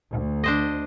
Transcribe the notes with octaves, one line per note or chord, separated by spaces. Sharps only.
D2
D4 C5 D#5